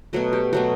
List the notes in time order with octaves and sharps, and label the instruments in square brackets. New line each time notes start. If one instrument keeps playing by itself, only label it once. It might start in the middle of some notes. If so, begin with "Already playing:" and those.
[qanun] B2 F#3 A3 F#4
G4
B2 F#3 A3 F#4